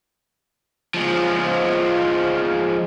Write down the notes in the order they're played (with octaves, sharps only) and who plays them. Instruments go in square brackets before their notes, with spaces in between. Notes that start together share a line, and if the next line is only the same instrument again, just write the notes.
[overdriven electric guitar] F3 G#3